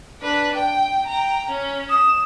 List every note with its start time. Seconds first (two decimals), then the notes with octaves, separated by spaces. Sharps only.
0.21 D4 B4
0.55 G5
1.06 G5 A#5
1.49 C#4
1.90 D#6 E7